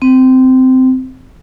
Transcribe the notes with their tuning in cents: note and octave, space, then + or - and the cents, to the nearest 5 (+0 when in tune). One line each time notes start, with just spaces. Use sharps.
C4 -15